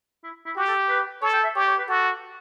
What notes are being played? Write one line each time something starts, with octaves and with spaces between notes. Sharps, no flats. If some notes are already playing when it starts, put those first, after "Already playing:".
E4
E4
F#4 G4
A4
B4
A4 C#5
G5
E5
G4 C#5
C#5
B4
F#4 A4